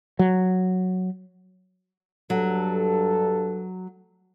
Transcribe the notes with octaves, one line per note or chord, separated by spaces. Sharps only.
F#3
G2 F#3 A4